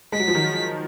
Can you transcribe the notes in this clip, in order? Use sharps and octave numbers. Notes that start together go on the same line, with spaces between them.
G#3 B6
F#3
F3
D#3 F#3